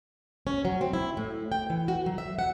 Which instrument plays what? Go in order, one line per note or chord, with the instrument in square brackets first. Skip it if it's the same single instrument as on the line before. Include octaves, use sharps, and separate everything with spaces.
[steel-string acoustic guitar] C#4
F#3
C4
E4
A2
G5
E3
F#4
F#3
E5
F#5